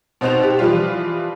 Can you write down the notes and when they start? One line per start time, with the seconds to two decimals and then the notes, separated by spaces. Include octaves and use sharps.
0.21 B2 C4 D#4 C5 F#6 F7
0.43 G4
0.59 E3 F3 G3 F4